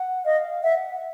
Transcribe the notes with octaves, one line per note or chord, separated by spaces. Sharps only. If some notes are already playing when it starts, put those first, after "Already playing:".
Already playing: F#5
D#5 F5
E5 F#5